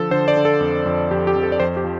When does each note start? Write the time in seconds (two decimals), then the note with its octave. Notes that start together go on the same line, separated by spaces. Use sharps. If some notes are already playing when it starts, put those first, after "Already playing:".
Already playing: D3 F3 A4
0.11 D3 C5
0.28 D5
0.37 D3
0.45 A4
0.60 F2
0.86 F2
1.11 F2 G4
1.27 G4
1.36 F2
1.43 A4
1.52 D5
1.60 F2 C5
1.77 G4
1.84 F3